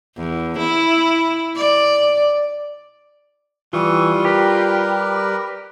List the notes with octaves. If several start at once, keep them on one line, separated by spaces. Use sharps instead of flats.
E2
E4
D5
E3 G3 F4 C#6 D#6
G4 A#4 B4